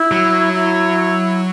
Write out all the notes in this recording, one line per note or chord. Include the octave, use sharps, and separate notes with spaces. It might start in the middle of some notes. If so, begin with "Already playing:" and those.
Already playing: E4
F#3
E4